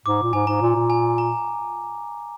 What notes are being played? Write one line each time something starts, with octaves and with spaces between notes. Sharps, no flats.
G#2 D6
A#2
G#2 G#5
G#2 A#5
A#2
A#2
G#5
A#5